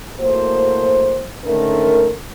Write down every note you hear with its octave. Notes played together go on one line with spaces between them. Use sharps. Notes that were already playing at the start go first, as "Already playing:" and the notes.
A2 A#3 F#4 C5
G#2 D3 D#3 A3 C#4 A#4